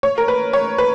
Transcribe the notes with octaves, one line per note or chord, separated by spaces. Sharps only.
C#5
A#4
B4
C#5
B4